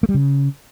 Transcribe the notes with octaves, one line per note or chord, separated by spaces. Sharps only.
A3
G3
C#3